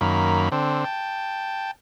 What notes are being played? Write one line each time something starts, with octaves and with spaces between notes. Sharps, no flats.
F#2 D#3 A#3 B5
D3 C4
G5 A5